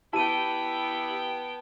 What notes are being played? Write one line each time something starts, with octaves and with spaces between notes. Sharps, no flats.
B3 E4 G4 G5 A5 D#7